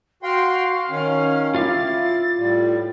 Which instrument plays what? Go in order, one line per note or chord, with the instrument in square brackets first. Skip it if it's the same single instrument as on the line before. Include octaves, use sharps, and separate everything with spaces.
[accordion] F#4 G5 C6 [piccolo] F5
[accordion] D#3 C#4
[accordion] E4 [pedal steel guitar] F4 F5 D6 [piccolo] A6
[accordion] A2 G3